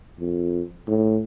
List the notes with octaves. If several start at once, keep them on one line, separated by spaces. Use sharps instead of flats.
F2
A2